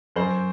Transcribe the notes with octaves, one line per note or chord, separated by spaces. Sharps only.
F#2 C5